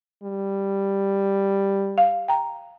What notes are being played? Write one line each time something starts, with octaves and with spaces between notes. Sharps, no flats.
G3
F5
G5 A#5